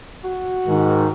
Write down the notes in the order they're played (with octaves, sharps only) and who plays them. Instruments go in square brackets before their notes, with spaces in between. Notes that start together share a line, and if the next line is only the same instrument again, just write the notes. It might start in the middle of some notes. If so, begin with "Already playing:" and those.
[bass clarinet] F#4
[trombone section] G#2 D#3